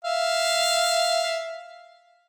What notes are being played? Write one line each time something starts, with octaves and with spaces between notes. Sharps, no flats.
E5 F5